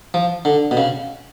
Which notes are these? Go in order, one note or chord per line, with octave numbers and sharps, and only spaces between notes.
F3
D3
B2
C#3